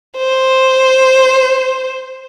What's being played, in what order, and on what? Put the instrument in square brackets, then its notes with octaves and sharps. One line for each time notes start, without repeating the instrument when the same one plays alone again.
[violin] C5